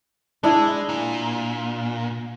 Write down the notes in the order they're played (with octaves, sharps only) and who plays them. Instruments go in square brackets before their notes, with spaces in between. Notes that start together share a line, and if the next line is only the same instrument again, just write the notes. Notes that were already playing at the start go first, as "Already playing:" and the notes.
[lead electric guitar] G#3 [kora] D4 E4
[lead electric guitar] A#2